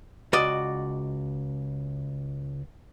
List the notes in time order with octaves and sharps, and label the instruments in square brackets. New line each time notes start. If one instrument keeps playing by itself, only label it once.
[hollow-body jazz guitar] C#2 F#4 D5 D#5